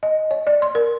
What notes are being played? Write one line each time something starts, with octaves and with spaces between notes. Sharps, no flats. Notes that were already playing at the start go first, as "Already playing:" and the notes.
D#5
C#5
D5
C6
A#4